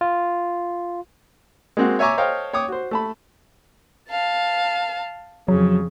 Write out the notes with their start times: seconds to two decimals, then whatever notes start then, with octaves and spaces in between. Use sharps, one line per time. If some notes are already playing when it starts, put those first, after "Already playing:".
0.01 F4
1.77 G#3 A#3 C4 F#4
1.99 C#5 E5 G#5 A#5 C#6 D6
2.17 A4 C5 C#5 D#5 F5 G5
2.53 C#5 G5 D6 D#6
2.69 F#4 C5
2.91 A3 A5 B5
4.09 F5 A5
5.48 F2 C#3 F#3